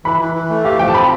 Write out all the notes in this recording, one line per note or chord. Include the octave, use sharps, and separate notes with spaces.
E3 B5
E3
E3
A3
G4 F5
F3 G5
A5
C4 B5